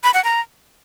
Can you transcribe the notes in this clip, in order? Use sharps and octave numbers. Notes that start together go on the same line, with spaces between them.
B5
F#5
A#5